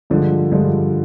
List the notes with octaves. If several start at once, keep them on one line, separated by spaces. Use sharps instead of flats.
G2 D3 F3 G#3
G2 D3 F3 G#3